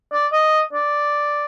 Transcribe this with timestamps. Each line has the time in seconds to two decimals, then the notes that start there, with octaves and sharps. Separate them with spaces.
0.13 D5
0.33 D#5
0.73 D5